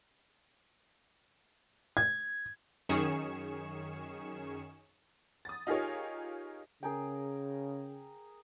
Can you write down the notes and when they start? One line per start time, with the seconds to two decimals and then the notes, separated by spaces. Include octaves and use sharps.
1.97 G#6
2.89 F#2 D#3 C#4 G#4 C#6 E7
5.45 D#6 A6
5.67 D#4 F4 G4 G#4 A#4 C#5
6.83 C#3 G#4 A#4 G5